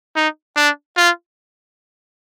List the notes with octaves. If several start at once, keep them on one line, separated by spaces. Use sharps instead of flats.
D#4
D4
F4